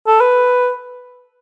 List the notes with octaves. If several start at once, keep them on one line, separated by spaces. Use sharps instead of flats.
A4
B4